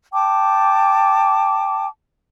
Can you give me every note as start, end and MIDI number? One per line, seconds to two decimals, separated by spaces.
0.13 1.86 79
0.13 1.86 81
0.13 1.86 86